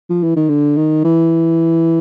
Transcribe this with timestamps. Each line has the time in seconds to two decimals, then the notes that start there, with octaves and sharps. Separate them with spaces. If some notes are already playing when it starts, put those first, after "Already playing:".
0.10 F3
0.23 E3
0.36 D#3
0.49 D3
0.77 D#3
1.04 E3